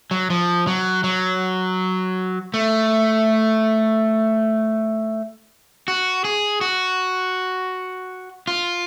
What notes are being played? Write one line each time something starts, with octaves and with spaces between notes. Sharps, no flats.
F#3
F3
F#3
F#3
A3
F#4
G#4
F#4
F4